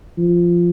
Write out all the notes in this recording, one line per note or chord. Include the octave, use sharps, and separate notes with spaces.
F3